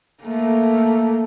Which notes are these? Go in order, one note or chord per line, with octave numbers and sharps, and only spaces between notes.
A3 A#3